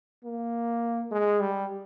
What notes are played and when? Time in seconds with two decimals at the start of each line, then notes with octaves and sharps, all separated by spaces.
0.24 A#3
1.11 G#3
1.40 G3